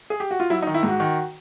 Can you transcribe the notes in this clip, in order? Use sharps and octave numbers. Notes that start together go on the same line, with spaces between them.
G#4
G4
F#4
F4
F#3 E4
D#4
D#3
E4
G#2 F#4
D#3